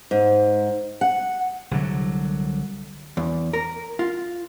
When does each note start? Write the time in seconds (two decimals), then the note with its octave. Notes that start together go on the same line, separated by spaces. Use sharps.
0.11 G#2
1.01 F#5
1.71 C2 D3 F#3
3.17 E2
3.53 A#4
3.99 F4